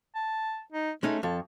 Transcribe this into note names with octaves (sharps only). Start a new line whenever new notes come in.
A5
D#4
G#3 A3 C#4 D#4
F2 A4